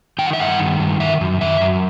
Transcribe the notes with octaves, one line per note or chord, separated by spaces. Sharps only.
D#3 G5
F#5
E5
G2 F#5
D#3
G2
D#3 E5
F#2
D#3 E5
F#2